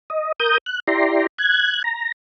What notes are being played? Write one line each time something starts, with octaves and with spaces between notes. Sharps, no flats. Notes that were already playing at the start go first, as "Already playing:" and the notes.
D#5
A#4 D#6 G6
F#6
E4 G4 D5 A#5 C6
F#6 G#6
A#5